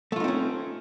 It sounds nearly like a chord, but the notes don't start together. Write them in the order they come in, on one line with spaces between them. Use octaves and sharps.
A3 F4 D#4 C4 C#4